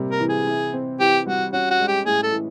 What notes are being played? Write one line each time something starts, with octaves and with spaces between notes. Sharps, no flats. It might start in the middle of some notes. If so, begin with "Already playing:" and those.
Already playing: C3 G3 A#3
A#4
E3
G#4
E4
C4
E3 G4
G3 F#4
C#4 F#4
F#4
G#3
G4
A2 G#4
A4
E3